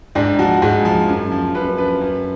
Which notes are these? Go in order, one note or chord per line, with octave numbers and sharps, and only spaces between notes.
G#2 D4
F3 F#4
G#2 G#4
F3
F#2
F3
F#2 B4
F3 B4
F#2